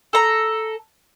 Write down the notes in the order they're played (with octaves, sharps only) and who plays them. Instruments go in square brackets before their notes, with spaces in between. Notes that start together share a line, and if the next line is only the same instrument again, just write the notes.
[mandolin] A4 A#5